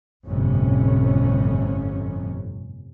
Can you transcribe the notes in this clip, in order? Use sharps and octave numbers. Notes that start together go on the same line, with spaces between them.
G1 F2 A2 C3 C#4